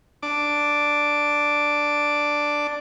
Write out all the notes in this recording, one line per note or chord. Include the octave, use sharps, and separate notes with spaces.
D4 D6